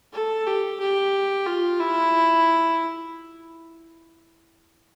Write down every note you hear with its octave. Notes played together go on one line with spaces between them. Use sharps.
A4
G4
G4
F4
E4